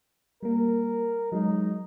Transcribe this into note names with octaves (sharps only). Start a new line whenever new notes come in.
G3 A#3 A#4
F#3 G#3 D#4